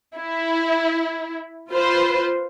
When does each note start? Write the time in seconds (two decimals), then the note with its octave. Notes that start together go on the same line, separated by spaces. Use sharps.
0.17 E4
1.72 F4 B4 C5